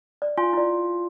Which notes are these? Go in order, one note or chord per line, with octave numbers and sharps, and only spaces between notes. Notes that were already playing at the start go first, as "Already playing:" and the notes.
D5
F4 G#5
E4 D5